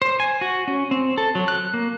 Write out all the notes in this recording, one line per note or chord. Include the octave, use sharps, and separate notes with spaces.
C5
G#5
F#4
C#4
C4
A4
F#3
F#6
A#3